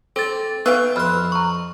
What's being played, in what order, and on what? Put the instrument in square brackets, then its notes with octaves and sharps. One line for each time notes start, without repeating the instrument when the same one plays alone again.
[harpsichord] C4 [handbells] A4 A6
[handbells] B3 E6 [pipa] B4 F5 G5 [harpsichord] E5
[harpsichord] F2 C6 [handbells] B5 F6 F#6
[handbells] A#5 C#6